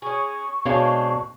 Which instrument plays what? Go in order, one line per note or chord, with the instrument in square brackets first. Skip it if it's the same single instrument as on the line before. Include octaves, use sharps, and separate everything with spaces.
[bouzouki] C#4 G#4 [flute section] C#6
[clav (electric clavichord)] B2 G#5 [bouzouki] G#3 C4 [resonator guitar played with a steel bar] D4 C#5 F5